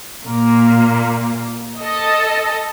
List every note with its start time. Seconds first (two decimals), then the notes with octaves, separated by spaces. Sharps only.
0.24 A#2 A#3
1.80 A4 D#5